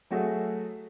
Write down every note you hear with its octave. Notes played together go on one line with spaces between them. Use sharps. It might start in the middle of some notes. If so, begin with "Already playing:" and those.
F#3 A3 F#4 G#4 E5